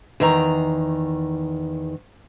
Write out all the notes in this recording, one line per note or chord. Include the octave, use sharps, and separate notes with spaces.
E2 D#3 A#5